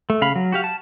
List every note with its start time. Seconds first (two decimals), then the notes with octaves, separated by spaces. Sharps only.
0.10 A3
0.21 C#3 F5 B5
0.36 F#3
0.52 F#4 G4 F5
0.64 A5